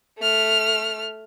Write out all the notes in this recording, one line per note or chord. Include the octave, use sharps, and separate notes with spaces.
A3 F6